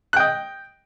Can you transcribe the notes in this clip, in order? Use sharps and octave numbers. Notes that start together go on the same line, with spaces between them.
D#5 G5 F#6